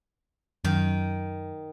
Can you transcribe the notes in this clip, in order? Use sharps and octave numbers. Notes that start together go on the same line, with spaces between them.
F#2 D#3